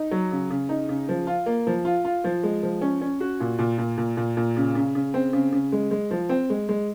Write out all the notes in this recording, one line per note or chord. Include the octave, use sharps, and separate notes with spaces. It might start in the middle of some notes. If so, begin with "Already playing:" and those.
Already playing: D#4
F#3
C#3
C#3
D#4
C#3
F3
F4
A#3
F3
F4
F4
F3
G#3
F3
C#4
C#4
F#4
A#2
A#2
A#2
A#2
A#2
A#2
C#3
C#3
C#3
C4
C#3
C#3
G#3
G#3
F3
C4
G#3
G#3